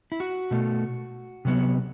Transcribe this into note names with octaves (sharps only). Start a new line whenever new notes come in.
E4
F#4
B2 A3
C3 F#3 B3